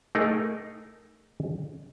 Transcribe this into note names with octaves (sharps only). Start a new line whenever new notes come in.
A3 D#4 G#4 A#4